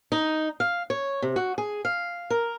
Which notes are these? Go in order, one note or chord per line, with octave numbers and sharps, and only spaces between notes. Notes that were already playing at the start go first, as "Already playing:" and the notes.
D#4
F5
C#5
C3
F#4
G#4
F5
A#4